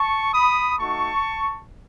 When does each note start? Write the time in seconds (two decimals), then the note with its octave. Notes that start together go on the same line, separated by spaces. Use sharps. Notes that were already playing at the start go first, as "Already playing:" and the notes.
Already playing: A5 C#6
0.34 B5 D#6
0.79 A3 D#4 F#4 A5 C#6